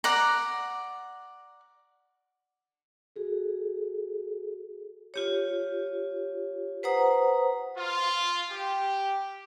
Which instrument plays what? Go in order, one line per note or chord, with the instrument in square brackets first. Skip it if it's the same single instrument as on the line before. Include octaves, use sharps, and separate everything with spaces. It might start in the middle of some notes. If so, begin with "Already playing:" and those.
[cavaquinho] D5 F#5 A#5
[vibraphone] F#4 G#4 A4
F4 G4 C#5
B4 C5 F#5 A#5 D#6
[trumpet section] F4
G4